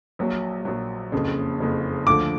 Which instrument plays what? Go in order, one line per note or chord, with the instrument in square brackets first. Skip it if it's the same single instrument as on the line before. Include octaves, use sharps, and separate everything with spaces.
[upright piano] A#1 A#2 F#3
A#1 A#2 F#3
F#1 F2 C#3
F#1 F2 C#3
[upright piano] D2 D3 F3 [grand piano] D6